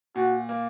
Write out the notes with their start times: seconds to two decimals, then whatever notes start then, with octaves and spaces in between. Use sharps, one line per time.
0.16 A#2 F#4
0.49 A#3